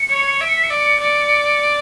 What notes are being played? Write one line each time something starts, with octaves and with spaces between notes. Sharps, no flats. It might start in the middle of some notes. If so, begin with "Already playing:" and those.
Already playing: C#7
C#5
E5 D7
C#7
B6
C#7
D5
D5